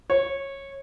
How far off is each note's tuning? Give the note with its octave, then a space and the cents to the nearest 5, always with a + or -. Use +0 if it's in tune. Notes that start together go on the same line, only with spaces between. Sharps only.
C#5 -15